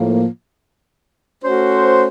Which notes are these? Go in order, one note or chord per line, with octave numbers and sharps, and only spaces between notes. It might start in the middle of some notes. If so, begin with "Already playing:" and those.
Already playing: A2 F3 A#3
A3 C#4 F#4 C5